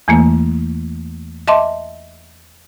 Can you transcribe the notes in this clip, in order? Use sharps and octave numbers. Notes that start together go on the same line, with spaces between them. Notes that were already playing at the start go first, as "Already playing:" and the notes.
E2 E3 A3 A#3
D#5 E5 A5 C6 D6